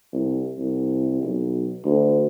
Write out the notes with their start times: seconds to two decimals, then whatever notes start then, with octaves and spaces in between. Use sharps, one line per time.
0.12 C2
0.58 C2
1.22 B1
1.85 D2